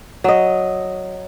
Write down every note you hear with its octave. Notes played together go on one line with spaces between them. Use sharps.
F#3 D#5